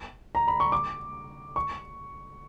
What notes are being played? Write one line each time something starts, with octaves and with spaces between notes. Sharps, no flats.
A#5
B5
C#6
D6
C#6